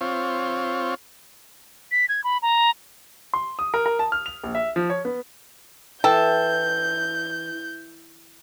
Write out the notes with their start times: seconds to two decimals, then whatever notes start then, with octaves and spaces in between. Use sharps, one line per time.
0.01 C4 F4 C#5
1.91 B6
2.09 G#6
2.24 B5
2.42 A#5
3.34 C6
3.59 D#6
3.74 A#4
3.86 A#4
3.99 A5
4.12 F6
4.26 F7
4.43 A#1
4.55 E5
4.76 F3
4.90 C#5
5.05 B3
6.04 E3 A4 G5 G6